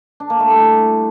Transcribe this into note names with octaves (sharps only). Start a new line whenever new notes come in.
D4
A#3
A3
G3
E4